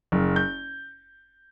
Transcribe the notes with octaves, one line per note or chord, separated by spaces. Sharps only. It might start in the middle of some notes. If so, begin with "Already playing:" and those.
F#1
G6